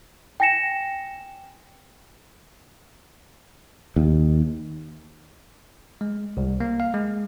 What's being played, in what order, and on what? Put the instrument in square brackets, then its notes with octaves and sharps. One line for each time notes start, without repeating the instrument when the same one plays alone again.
[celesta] G5 G#5 A#6 C#7 E7
[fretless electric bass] D#2
[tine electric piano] G#3
C2
A#3
F5
G#3